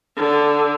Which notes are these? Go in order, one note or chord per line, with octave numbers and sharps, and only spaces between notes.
D3